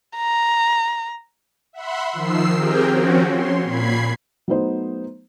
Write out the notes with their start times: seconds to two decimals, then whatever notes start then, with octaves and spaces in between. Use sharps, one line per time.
0.16 A#5
1.73 E5 F#5 B5 C6
2.13 D#3 F3 E6 C7
2.55 C4 G4 G#4 A#4 G5
2.85 F3 C4 C#4 F#4
3.31 C#5 C6
3.63 A#2 B5 G#6 C7
4.48 F#3 A3 B3 D#4 C5